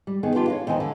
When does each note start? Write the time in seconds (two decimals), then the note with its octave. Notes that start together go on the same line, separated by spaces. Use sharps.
0.07 G3
0.23 D#3 B3 G#4
0.35 B3 D4 F4 G4
0.48 C#5 D#5 F5
0.67 D#2 D#3 E3 C4 G#5
0.80 D3